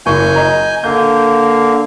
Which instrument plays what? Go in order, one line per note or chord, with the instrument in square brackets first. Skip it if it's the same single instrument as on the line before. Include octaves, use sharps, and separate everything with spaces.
[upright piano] F#1 C#6 [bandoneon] G#5 G6
[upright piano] D#5 A#5
[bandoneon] D3 A#3 [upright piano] G6